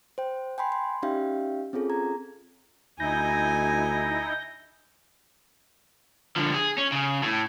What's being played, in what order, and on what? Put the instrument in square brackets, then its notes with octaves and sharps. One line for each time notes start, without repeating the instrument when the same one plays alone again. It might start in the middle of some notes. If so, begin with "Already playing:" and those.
[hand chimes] C5 G5
G5 G#5 B5 C6
C6
C#4 D#4 G4 E5 F5 G5
C4 C#4 F4 G#4 A4
A#5 G#6
[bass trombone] D2 [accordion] D#4 E4 [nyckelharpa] G#5 [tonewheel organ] G6 A#6
[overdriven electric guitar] D3 F3
G#4
C#4
C#3
A2